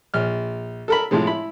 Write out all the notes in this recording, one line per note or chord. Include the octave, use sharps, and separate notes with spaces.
A#1 F6
A4 A#4 B5
A2 C3 F3 G#3
E4 B5